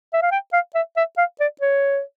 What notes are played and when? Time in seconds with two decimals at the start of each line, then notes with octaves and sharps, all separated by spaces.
0.13 E5
0.22 F5
0.31 G5
0.53 F5
0.75 E5
0.97 E5
1.17 F5
1.40 D5
1.61 C#5